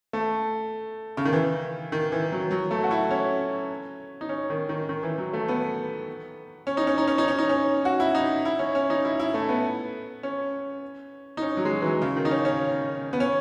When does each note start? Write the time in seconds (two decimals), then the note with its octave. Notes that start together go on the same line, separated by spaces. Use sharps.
0.13 A3
1.17 C#3
1.25 D#3
1.33 E3
1.92 D#3
2.12 E3
2.32 F#3
2.51 F#3
2.71 A3
2.84 F#4
2.91 E4
3.11 C#4
4.21 D#4
4.29 C#4
4.50 D#3
4.69 D#3
4.89 D#3
5.03 E3
5.18 F#3
5.33 A3
5.48 B3
6.67 C#4
6.77 D#4
6.87 C#4
6.98 D#4
7.07 C#4
7.18 D#4
7.28 C#4
7.38 D#4
7.49 C#4
7.85 F#4
8.00 E4
8.15 D#4
8.45 E4
8.59 C#4
8.75 C#4
8.90 D#4
9.05 E4
9.19 E4
9.34 A3
9.49 B3
10.23 C#4
11.37 D#4
11.42 C#4
11.57 F#3
11.65 G#3
11.71 F#3
11.81 E3
11.86 F#3
12.02 C#3
12.16 D#3
12.25 D#4
12.31 C#4
12.45 C#4
13.13 B3
13.20 C#4